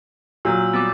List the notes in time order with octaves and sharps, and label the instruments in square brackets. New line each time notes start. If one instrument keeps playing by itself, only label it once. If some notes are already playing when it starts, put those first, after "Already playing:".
[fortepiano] A#2 F#3 [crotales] E6 G6
[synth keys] G3 B3 [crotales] D6 A6